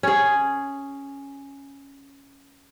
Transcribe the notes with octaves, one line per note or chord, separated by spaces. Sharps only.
C#4 G#4